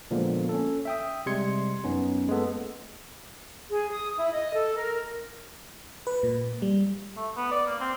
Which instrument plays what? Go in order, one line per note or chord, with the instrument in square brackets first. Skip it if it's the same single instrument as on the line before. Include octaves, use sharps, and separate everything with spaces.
[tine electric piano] A#2 D3 F3 G#3 A#3 B3
C#4 A4
E5 G5 D#6
C3 G3 G#3 C6 G#6 C#7
F#2 B3 C#4 D#4
G#3 A#3 B3 A4
[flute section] G#4
D#6
E4
D#5
A4
A#4
[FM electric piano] B4
A#2
G3
[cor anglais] A3
B3
D5
A#3
C4